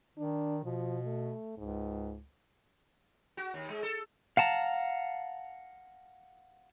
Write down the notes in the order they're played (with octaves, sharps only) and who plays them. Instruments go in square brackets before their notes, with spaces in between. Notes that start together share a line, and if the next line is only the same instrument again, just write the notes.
[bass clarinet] D#3 [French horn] D4
[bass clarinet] B2 [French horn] F3
[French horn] A3
[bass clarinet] C#2 [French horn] G#2
[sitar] F#4
D#2
G#3
A4
[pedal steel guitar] F5 F#5 A5 A#5